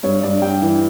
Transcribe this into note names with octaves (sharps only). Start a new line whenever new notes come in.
G2 C#5
G2 D5
G2 G5
E3